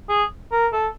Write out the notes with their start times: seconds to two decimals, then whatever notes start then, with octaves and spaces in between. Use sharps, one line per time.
0.09 G#4
0.52 A#4
0.73 A4